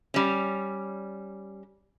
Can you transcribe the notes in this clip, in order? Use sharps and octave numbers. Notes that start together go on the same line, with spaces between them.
G3 C#4